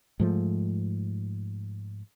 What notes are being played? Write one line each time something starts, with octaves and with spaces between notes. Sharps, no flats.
G#2 F3 A3